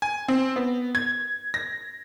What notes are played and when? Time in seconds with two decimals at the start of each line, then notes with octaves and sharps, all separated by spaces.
0.02 G#5
0.28 C4
0.56 B3
0.95 G#6
1.54 A#6